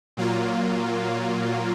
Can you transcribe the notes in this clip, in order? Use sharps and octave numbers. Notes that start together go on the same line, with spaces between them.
A#2 F#3 A#3 F4